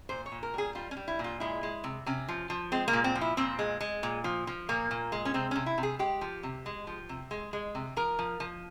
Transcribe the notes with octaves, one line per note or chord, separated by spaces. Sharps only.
A#2 C5
C#5
A#2
A#4
G3 G#4
G3 F4
C#4
G3
E4
A#2
F4
G#3 E4
G#3
C3
C3 C#4
F3
F3
G#3 C4
A#3
A#2
C4
F3
E4
A#2 C4
G#3
G#3
A#2
F3
F3
A#2 A#3
A#2
G#3
C#4
C3 C4
C3 C#4
E4
C3
G#4
G#3 G4
F3
C3
G#3
F3
C3
G#3
G#3
C3
F3 A#4
F3
F3